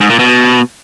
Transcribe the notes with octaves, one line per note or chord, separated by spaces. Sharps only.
G#2
A#2
B2